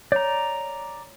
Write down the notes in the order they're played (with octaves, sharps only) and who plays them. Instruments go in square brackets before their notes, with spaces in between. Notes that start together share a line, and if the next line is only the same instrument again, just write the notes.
[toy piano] C#5 [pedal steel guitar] D5 A#5